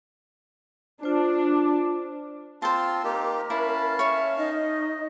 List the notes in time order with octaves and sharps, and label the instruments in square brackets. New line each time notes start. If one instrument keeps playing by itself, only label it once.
[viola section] D4 [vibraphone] F4 C5
[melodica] C4 F4 C6 [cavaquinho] C5 A5
[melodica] A#3 D#4 G4 [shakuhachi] A#4
[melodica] C#4 F5 A5 [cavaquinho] E4 [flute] B5
[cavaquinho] C#5 C#6 [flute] E5
[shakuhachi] D#4 [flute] D#5